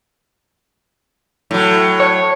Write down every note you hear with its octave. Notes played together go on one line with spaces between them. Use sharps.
A2 F#3
C#5